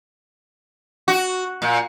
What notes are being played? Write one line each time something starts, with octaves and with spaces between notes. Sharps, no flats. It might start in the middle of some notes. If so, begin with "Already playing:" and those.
F#4
A#2